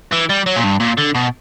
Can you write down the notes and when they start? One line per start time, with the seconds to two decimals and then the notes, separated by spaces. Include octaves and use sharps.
0.11 E3
0.29 G3
0.46 F#3
0.56 A#2
0.64 G2
0.80 A#2
0.98 D3
1.15 B2